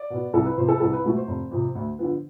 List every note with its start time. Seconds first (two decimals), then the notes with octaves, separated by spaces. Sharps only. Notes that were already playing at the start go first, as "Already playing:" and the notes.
Already playing: D5
0.10 B2 B3
0.33 C2 A4
0.46 B4
0.57 C3 F3 B3 C5
0.68 A4
0.76 B4
0.80 C2 A4
0.93 B4
1.04 B2 A3
1.16 C5
1.27 F1
1.51 F2 C3
1.75 D2
1.99 D3 F3 B3